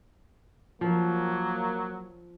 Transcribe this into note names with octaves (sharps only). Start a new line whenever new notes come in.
F3 F#3 A#3